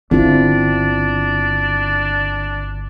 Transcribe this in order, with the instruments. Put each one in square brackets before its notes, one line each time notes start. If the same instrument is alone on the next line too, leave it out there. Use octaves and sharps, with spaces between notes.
[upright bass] G1 [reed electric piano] D3 [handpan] C4 E4 F4 [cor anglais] D4